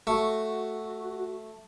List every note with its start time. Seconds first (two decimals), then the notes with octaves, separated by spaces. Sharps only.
0.07 A3 F#4 C#6